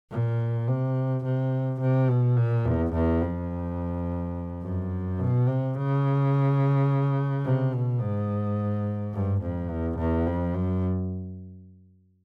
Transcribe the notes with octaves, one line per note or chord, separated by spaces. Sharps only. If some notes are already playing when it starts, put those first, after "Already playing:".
A#2
C3
C3
C3
B2
A#2
E2
E2
F2
F#2
B2
C3
C#3
C3
B2
G#2
G2
F2
E2
E2
F2
F#2